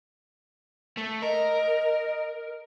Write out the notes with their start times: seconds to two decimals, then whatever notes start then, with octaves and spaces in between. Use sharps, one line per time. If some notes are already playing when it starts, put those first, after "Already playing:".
0.97 A3
1.22 A#4 D#5